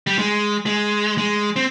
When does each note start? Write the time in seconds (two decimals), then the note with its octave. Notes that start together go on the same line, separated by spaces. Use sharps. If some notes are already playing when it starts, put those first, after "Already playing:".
0.07 G3
0.19 G#3
0.66 G#3
1.18 G#3
1.56 C4